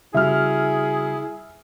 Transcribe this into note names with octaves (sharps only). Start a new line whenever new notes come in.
C#3 G3 E4 F#4 G#4 E5 F6